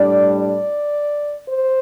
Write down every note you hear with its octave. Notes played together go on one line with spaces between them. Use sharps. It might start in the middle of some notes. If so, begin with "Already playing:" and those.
Already playing: A2 G3 D4 D5
D5
C5